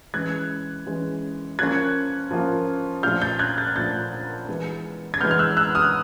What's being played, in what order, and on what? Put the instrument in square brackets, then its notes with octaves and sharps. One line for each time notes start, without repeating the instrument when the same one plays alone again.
[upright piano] E3 G#3 C#4 F#6 G#6
E3 G#3 C#4
F3 A#3 C#4 F4 F#6 G#6
F3 A#3 C#4 F4
A#2 F3 A3 D4 F4 F6 G6
G6 A6
F#6 G#6
G6 A6
A#2 F3 A3 D4 F4 G6 A6
E3 G#3 B3
G#6
E3 G#3 B3 F6 G6
F6
E6 F#6
E6 F#6
D#6 F6